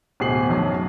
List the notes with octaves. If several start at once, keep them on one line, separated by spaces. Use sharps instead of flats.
D1 B2 G#4 C7 F#7
B1 F#2 F#3